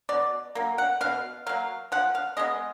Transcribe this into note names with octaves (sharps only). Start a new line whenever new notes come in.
B2 D5
F#3 A#3
F#5
B2 F5
F#3 A#3 F5
F3 F#5
F5
G#3 B3 D#5